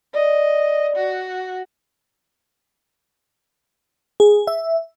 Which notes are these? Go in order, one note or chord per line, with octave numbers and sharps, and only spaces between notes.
D5 D#5
F#4
G#4
E5